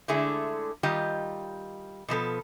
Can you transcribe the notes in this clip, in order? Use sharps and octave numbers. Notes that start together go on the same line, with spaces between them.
D3 G#3 A3 D4 E4 G#4
D#3 G3 F4 G4 D#5
B2 F3 B3 A4